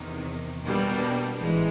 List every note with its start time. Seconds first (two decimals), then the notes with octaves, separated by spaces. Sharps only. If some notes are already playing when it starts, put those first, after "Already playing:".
Already playing: E2 C3 D#3
0.64 B2 G3 A#3 D4
1.39 A1 G#2 E3 G#3